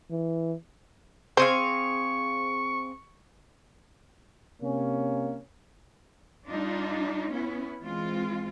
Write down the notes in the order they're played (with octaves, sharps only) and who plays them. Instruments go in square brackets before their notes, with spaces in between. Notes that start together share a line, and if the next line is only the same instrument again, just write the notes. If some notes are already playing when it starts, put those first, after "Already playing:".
[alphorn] E3
[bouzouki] C4 G#4 F5 [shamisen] C5 [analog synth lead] C#6
[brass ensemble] C3 A#3 C#4
[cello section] G3 D4 D#4 F4
B3 C#4 E4
E3 G#3 C4 F4